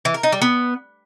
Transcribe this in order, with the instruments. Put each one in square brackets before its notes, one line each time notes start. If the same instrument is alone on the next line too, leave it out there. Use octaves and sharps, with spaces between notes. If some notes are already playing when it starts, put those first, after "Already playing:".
[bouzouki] E3
A#4
D#4
G3
B3